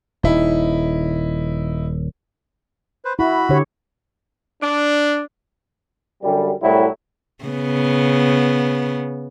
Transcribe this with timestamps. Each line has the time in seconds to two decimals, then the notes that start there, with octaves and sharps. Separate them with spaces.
0.23 D#1 D#4 E4
3.05 B4 C5
3.19 E4 F#4 B5
3.49 D3 G4 C#5
4.61 D4
6.22 F#2 D3 G3
6.63 C2 A2 F#3 G3 E4
7.44 C#3 B3